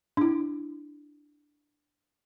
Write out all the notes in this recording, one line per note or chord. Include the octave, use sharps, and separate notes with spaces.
D4 E4